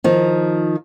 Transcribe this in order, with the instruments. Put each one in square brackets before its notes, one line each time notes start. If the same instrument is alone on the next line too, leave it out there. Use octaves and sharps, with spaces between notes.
[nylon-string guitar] D#3 F3